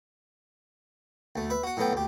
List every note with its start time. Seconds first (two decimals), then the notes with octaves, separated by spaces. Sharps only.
1.36 D2 A3
1.50 B4 E5
1.63 F#4 F#5
1.77 A2 F#3 B3 A4 G5
1.93 D2 G4